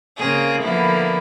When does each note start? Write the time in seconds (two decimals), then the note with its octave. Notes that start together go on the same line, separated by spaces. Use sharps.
0.17 C#3 A#3 C4 G#4
0.61 D3 F3 A#3 B3 E4